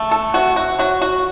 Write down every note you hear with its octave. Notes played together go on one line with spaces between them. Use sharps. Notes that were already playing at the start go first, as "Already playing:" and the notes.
Already playing: C#3 A3
A4
C3 F#4
F#4
F#3 F#4
F#4